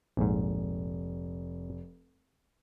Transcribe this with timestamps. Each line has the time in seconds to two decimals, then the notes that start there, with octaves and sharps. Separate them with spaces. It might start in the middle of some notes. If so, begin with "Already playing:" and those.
0.17 F1 A#1 G#2